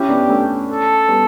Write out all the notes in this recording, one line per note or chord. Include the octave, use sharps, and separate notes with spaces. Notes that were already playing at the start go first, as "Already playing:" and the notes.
Already playing: C#4 E4 G4
B3 D4
A3 C#4
A4
G3 B3